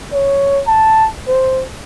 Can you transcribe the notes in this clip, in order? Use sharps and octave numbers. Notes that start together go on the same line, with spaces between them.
C#5
A5
C5